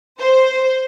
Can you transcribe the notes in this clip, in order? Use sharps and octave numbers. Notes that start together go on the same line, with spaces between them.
C5